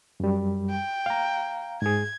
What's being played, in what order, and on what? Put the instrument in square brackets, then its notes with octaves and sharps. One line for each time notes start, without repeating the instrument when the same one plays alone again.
[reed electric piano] F#2 G3
[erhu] G5
[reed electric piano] F5 A#5
[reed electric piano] G#2 G#4 [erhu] G#6